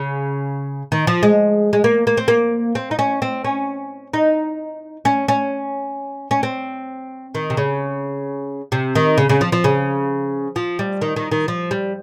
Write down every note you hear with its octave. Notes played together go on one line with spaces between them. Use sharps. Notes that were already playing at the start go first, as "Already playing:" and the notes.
Already playing: C#3
D#3
F3
G#3
G#3
A#3
A#3
C4
A#3
C4
D#4
C#4
C4
C#4
D#4
C#4
C#4
C#4
C4
D#3
C3
C#3
C3
D#3
C#3
C#3
F3
F3
C#3
F3
G3
D#3
D#3
D#3
F3
G3